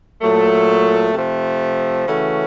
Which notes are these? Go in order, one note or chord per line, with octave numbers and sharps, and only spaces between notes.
A#2 F#3 A3
C3 F3 A3
C#3 E3 A3 C#4 F#4